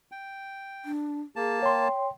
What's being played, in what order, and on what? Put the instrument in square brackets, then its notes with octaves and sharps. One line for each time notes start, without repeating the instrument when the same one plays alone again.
[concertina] G5
[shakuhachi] D4
[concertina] A#3 A5 [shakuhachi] G#4
[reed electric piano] C#5 C6 [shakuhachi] G5